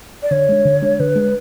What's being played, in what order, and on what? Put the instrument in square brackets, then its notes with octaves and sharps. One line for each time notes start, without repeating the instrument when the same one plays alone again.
[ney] D5
[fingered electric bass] D3 [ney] C#5
[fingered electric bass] G#3 D4
D3
G#3 D4
[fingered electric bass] D3 [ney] B4
[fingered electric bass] G#3 D4